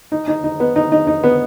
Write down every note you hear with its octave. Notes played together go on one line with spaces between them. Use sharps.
D#4
D#4
D#4
B3
D#4
D#4
D#4
B3